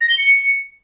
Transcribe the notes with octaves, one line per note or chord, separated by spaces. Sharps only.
A#6
G7
C#7